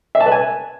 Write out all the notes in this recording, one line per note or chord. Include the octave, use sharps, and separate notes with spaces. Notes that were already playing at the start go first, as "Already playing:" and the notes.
E5
A5
B4
G#5